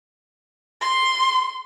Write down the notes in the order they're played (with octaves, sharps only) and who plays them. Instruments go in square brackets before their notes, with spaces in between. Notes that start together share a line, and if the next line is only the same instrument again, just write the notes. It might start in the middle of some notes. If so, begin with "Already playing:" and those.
[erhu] C6